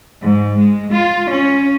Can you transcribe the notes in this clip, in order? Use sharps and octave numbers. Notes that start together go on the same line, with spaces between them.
G#2
G#3
F4
C#4